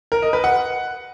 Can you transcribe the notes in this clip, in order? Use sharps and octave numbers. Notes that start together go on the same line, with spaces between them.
A#4
D#5
B4
F#5